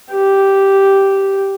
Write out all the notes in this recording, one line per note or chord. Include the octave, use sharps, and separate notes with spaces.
G4